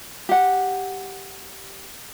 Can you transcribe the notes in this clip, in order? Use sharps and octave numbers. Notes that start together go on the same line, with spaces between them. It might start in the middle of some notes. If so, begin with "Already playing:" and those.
G4 F#5